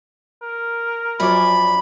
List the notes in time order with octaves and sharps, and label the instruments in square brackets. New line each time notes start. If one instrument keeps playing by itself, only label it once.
[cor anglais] A#4
[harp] F#2 C#5 D5 [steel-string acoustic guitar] F3 D4 [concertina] B5